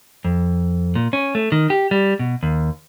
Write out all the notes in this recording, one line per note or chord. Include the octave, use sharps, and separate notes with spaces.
F2
A#2
C#4
A3
D#3
G4
G3
B2
D#2